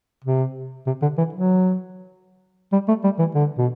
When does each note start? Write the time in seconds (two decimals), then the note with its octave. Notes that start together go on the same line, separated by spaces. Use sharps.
0.25 C3
0.87 C3
1.02 D3
1.18 E3
1.33 F#3
2.73 G3
2.88 A3
3.04 G3
3.19 E3
3.35 D3
3.58 B2